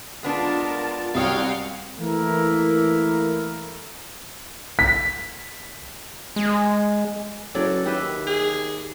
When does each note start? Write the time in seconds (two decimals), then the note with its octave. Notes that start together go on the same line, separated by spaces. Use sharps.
0.23 G#3 B3 D4 F4 A#4 A5
1.15 C2 F#4 C#5 F5 G5 D#6
2.00 E3 A3 A#3 E4 A#4
4.79 B6
6.36 G#3
7.55 F#1 F#3 A4 D5
7.86 D#2 G4 B4 E5
8.27 G#4